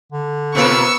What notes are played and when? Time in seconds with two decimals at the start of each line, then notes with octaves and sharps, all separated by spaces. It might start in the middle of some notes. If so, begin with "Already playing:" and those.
0.12 D3
0.55 B2 A#3 B3 F4 B4 C#6 E6